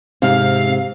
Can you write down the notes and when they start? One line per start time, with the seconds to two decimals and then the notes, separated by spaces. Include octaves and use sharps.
0.22 G#2 C3 C4 F5